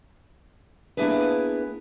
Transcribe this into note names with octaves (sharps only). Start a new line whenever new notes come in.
A#3 B3 D4 E4 G#4 B4